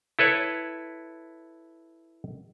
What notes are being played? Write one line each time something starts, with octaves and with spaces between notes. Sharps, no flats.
E4 A4 B4 C#5